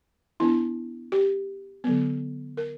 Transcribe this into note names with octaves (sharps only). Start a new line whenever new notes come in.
E3 B3 D4 E4
G4
D3 F#3 B3
A#4